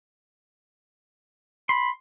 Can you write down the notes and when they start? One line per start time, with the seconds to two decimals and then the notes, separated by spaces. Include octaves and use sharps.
1.69 B5 C6